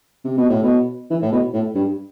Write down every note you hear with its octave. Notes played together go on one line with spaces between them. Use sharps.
C3
B2
A2
B2
E3
A2
B2
A2
G2